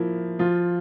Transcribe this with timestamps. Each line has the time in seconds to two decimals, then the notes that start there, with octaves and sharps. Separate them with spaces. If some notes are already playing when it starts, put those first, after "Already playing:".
Already playing: F3 A#3 E4
0.39 F3 F4